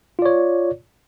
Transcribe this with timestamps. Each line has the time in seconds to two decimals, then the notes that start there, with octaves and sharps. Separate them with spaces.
0.19 F4
0.22 D5
0.26 C#5